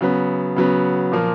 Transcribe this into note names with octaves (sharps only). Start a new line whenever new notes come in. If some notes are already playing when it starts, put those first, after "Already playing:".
C#3 F#3 B3
C#3 F#3 B3
A#2 F3 A#3